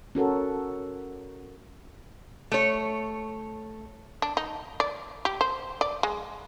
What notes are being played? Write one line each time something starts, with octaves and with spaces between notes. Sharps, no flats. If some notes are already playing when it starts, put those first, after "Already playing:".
C#4 F#4 A4 A#4
A3 C#5
D4
D#4
D5
G4
C5
D5
G#3